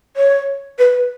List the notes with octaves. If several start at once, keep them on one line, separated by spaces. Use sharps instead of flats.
C#5
B4